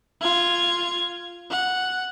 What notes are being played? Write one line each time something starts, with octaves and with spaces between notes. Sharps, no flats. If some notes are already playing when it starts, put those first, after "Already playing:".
F4 G#6
F#5